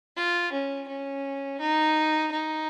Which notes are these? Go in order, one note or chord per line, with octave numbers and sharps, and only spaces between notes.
F4
C#4
C#4
D#4
D#4